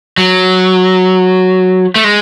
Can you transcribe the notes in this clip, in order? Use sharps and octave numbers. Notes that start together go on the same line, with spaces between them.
F#3
A3
G#3